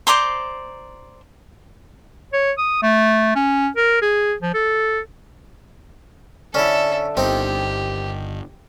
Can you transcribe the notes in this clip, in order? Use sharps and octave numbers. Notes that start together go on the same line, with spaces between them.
C5 D5 A#5 C6
C#5
D#6
A3
C#4
A#4
G#4
F3
A4
D3 C#4 E4 A4 E5
G1 D#3 C4 D#4 G4